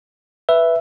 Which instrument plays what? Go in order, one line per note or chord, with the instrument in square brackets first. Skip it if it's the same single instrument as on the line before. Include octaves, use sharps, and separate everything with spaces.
[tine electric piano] B4 [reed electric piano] E5